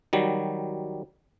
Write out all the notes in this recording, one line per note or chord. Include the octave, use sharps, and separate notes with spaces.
D#3 F#3 G3